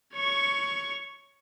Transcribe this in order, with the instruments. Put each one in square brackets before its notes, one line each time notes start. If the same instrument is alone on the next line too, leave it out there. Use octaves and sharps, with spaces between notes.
[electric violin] C#5 C#6